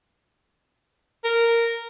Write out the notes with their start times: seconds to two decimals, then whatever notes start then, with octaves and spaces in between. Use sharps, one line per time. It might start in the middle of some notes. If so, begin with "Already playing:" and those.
1.24 A#4